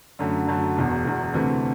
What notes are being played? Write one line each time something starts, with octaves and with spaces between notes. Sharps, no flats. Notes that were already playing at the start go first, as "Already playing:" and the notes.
F#2 D3 F#3 A3
F#2 D3 F#3 A3
E1 E2 B2
E1 E2 B2
D2 C3 E3 A3